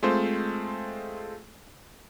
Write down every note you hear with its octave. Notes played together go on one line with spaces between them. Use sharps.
G#3 A3 C4 F4 C5